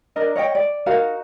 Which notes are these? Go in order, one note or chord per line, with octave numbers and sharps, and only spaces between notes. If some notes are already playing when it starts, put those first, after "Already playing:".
D4 A#4 D#5
C#5 D#5 F5 G5
D5
D#4 F#4 A#4 F5